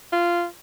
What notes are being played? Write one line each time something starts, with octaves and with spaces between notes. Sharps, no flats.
F4